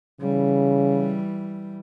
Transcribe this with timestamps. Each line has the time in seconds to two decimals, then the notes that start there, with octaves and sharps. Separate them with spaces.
0.21 C#3 E3 G3